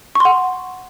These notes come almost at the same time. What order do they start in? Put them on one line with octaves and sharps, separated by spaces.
C#6 C6 F#5